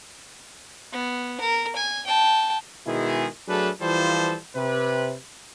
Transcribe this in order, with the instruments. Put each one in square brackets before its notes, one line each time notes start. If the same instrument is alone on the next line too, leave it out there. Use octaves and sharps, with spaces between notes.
[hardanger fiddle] B3
A#4
G#5
G5 A5
[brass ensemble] B2 D#3 G#3 E4 G#4
F#3 A3 D4 G#4 A4 B4
E3 F3 G3 F4 A4 C5
C3 B4